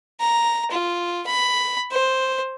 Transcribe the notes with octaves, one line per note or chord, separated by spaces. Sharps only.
A#5
F4
B5
C5